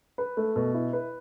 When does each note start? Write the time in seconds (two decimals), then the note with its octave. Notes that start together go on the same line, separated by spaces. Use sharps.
0.18 B4
0.37 A3
0.56 B2
0.74 E4
0.93 B4